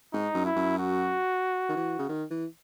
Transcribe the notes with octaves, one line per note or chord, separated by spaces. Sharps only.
G#2 D#4
F#2
E4
F#2
F#4
D#3
E3
C#3
D#3
E3